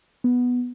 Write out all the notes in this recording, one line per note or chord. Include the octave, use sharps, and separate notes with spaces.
B3